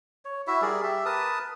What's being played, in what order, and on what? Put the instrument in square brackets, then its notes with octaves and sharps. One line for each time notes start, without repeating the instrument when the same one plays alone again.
[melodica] C#5
E4 F#4 E5
G3 G#4 A#4 D5
G4 E5
A#4 B4 A5 D#6